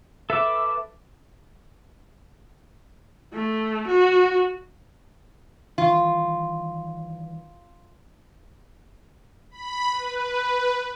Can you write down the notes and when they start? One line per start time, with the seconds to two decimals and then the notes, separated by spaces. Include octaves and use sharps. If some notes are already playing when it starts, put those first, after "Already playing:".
0.30 A4 B4 E5 D6
3.34 A3
3.88 F#4
5.78 D#3 E3 G3 F4
9.51 B5
9.92 B4